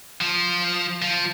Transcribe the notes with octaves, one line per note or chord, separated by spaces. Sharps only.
F3
F3